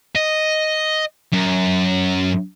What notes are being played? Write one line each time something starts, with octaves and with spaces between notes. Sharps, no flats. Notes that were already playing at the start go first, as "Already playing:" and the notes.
D#5
F#2